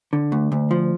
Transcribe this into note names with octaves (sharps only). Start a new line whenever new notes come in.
D3
D2
D2
F3